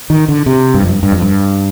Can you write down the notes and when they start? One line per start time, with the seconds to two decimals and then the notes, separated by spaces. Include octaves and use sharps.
0.10 D#3
0.28 D3
0.46 C3
0.74 G2
0.82 F2
0.89 G2
1.03 G2
1.12 F2
1.22 G2